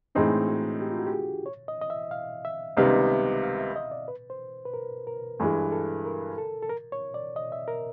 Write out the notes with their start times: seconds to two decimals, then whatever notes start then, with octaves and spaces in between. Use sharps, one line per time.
0.15 A2 E3 G#3 C4 D4 D#4
0.48 F#4
0.81 G4
0.91 F4
0.99 F#4
1.07 G4
1.13 G#4
1.46 C#5
1.68 D#5
1.81 D#5
1.90 E5
2.11 F5
2.45 E5
2.77 C#2 C3 D#3 G3 B3 F5
3.03 D#5
3.09 E5
3.43 F5
3.59 E5
3.76 D#5
3.91 D5
4.08 B4
4.30 C5
4.65 B4
4.74 A#4
5.07 A#4
5.40 G2 E3 G#3 A4
5.72 A4
6.05 A#4
6.38 A4
6.62 A4
6.70 A#4
6.92 C#5
7.14 D5
7.36 D#5
7.52 E5
7.68 A#4